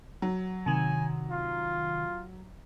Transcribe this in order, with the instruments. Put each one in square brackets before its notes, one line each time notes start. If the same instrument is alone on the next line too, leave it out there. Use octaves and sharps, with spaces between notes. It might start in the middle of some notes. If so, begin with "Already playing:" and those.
[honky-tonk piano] F#3
[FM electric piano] C3 D#3 [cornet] G#5
[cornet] F4